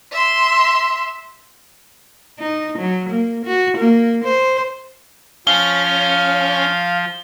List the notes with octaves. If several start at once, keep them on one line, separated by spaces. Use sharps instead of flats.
E5 C6
D#4
F#3
A#3
F#4
A#3
C5
F3 C#4 F5 G7